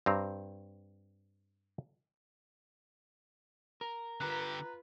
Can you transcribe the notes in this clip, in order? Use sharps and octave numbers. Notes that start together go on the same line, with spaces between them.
G2 C4 A#5
A#4
D3 F4 G4 B4 A#5 F#6